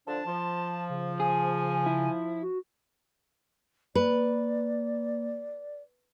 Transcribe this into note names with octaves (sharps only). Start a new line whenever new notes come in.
D3 F3 D4 A5
F3 C6
C#3
G#4 G#5
E4
F#4
A#3 B4 D5